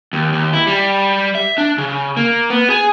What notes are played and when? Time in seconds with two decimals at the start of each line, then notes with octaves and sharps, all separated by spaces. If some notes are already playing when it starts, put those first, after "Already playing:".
0.13 D#2
0.32 D#2
0.53 E4
0.67 G3
1.35 E5
1.58 D4
1.78 C#3
2.17 A#3
2.50 B3
2.70 G#4